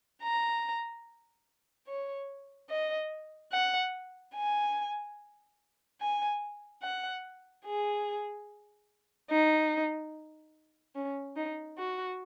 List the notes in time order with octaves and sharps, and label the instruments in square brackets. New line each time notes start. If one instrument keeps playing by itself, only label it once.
[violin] A#5
C#5
D#5
F#5
G#5
G#5
F#5
G#4
D#4
C#4
D#4
F#4